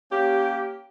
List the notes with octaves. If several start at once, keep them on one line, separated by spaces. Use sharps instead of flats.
A#3 C#4 G4